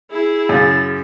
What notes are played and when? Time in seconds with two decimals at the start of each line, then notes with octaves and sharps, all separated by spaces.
0.10 E4 G#4
0.49 F#2 C#3 A6